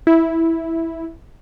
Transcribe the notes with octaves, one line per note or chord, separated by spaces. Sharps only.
E4